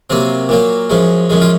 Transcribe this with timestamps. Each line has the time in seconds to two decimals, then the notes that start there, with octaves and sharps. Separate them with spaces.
0.10 C3 F#3 A#3 C4
0.49 A#2 F#3 A#3
0.90 F#2 F3 G#3
1.29 F#2 F3 G#3
1.41 F4